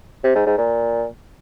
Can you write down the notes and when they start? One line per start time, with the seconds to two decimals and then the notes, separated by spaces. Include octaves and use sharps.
0.24 C3
0.35 G#2
0.46 G#2
0.58 A#2